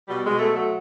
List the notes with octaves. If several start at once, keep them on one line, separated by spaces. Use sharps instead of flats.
B2 G3
B2 G#3
A3
F#3
A3